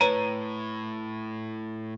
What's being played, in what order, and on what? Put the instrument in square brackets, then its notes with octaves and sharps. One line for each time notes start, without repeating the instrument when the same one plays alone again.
[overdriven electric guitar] A2 [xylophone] B4 C#5 [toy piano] A#5 [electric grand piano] D#7